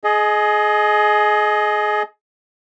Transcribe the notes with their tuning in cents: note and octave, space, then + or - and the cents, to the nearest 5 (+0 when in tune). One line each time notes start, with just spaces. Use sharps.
G#4 +25 D#5 +0